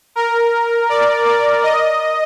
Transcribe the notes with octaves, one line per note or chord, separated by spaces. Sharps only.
A#4
D5
D5
D#5